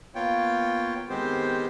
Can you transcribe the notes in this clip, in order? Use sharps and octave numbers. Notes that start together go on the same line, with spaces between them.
A#3 B3 F4 C#5 G5
D#3 G#3 B3 C4 G4 C5